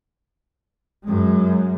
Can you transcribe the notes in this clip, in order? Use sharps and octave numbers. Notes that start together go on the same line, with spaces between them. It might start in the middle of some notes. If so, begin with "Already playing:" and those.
F#2 G#3